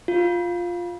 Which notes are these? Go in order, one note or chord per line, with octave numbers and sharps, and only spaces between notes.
F4